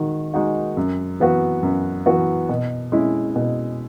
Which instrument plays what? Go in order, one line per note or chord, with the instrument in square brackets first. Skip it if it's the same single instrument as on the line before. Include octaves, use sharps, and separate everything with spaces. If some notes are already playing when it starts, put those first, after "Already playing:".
Already playing: [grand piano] D#3 G#3 F#4
G#3 D#4 F#4
F#2
E3 B3 F#4
F#2
E3 B3 F#4
B2
G#3 C#4 E4
B2